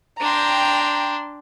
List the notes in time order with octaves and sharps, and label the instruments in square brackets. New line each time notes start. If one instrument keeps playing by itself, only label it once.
[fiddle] D4 C6 [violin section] G5 A#5